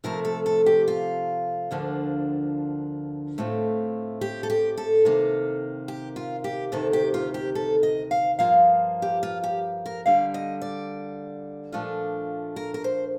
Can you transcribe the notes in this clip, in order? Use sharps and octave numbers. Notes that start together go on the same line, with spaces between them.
C3 F3 A3 A#4
A4
A4
G4
F4
D2 D3 F3 A#3 D4
A2 A3 C4 F4
G4
A4
G4
A4
C3 D#3 A#3
G4
F4
G4
D2 C3 D#3 A4
G4
F4
G4
A4
D#5
F5
G2 F3 A#3 F4 F5
G4
F4
G4
A#4
D3 G3 A#3 F5
D#5
D5
A#2 F3 A3 D4 F4
A#4
A#4
C5